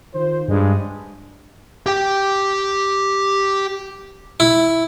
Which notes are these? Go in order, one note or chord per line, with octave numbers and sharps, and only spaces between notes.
D#3 F4 C5
G2 G3 G#3
G4 G5
E4